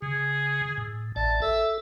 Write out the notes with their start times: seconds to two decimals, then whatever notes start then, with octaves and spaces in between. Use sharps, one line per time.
0.02 C#3 G#4
0.78 A2
1.16 A1 D5 A5
1.42 A4 E5